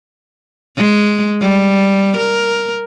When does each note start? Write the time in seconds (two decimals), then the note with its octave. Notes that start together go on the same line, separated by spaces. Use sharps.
0.77 G#3
1.41 G3
2.17 A#4